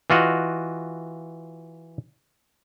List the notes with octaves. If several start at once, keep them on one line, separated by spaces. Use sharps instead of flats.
E3 F4 F#4 D#5